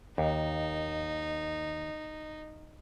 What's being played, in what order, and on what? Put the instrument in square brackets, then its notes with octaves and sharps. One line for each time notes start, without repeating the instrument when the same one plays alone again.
[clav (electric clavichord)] D#2 [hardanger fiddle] D#4